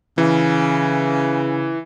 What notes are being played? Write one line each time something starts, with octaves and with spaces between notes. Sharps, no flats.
C#3 E3